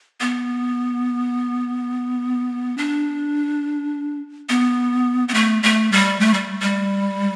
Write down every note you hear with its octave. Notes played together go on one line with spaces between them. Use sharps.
B3
D4
B3
B3
A3
A3
G3
A3
G3
G3